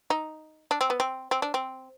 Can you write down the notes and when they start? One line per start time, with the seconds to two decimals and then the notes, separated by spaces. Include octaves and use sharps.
0.10 D#4
0.71 D4
0.81 C4
0.90 B3
1.00 C4
1.31 C4
1.42 D4
1.54 C4